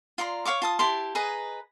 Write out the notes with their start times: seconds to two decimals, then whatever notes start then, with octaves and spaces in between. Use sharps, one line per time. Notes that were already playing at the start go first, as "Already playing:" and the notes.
0.18 F4 D5 A#5 C6
0.45 C#5 F5 C#6 D6
0.62 F4 A5 D#6
0.79 E4 G4 A5 C6
1.15 G#4 B4 D#5 A#5